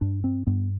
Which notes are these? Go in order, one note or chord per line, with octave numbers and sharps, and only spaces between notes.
G2 D4
C4
G2 B3